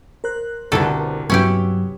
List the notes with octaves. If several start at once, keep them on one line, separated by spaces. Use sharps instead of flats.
A#4 C5 F#6
C2 G2 B2 D3 E4 A4
G2 C3 F#3 B3 C#4 E4 G4 E6